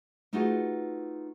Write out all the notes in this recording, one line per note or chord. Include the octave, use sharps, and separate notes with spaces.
A3 D#4 F4 F#4 G#4 B4